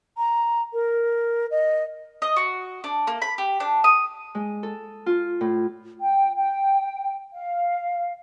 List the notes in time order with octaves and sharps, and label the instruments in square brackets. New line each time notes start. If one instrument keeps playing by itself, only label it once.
[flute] A#5
A#4
D#5
[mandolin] D#5
F#4
D4
A#3
B5
G4
D4
D#6
[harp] G#3
A4
F4
A2
[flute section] G5
G5
F5